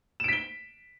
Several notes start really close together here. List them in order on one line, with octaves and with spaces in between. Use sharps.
E7 D7 B6 G7